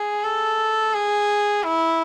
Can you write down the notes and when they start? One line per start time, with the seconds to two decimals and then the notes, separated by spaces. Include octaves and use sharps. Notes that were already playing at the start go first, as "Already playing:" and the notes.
Already playing: G#4
0.24 A4
0.94 G#4
1.63 E4